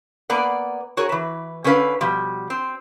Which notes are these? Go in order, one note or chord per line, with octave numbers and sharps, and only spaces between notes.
A#3 B3 D5 F#5
F#4 G#4 A#4 C#5
E3 B4
D3 C#4 D4 B4 F5
B2 F3 G3
C4